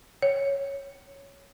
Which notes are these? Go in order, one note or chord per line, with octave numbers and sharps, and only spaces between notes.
C#5